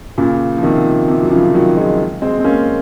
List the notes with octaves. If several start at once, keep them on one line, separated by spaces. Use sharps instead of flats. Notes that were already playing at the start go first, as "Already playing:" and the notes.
A#2 C#3
F3
C3 D#3
C3
F#3
C#3 F3
D#3 F#3
F3 G#3
G#3 C4
C4
A#3 C#4